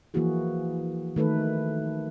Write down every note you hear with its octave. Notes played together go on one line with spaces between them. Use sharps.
E3 F3 A#3 E4 F#4 G#4
D#3 A3 A4 B4